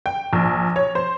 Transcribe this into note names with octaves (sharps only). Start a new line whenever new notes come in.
G5
A#1
C#5
C5